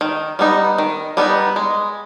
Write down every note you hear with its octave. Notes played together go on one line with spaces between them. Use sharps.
D#3
G3 B3 D#4
D#3
G3 B3 D#4
G#3